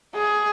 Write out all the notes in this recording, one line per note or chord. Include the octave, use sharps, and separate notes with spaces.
G#4